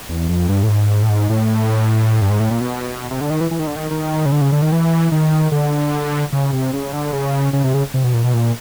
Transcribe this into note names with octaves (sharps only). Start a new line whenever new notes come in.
E2
F2
G2
A2
G#2
A2
G#2
A2
G2
G#2
A2
A#2
B2
C3
D3
D#3
E3
E3
D#3
D3
D#3
D#3
C#3
D3
C#3
D3
D#3
E3
D#3
D3
C#3
C3
C#3
D3
C#3
C#3
C3
C#3
C3
B2
A#2
B2
A#2